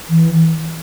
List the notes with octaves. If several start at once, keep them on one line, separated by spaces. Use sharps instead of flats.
E3